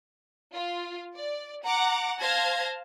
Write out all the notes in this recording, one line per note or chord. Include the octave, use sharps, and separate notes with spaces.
F4
D5
F#5 A#5 D6
C5 F5 A5 G#6 A#6